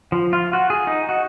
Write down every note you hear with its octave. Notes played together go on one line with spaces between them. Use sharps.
F3
F4
F#4
G#4
D#4
F#4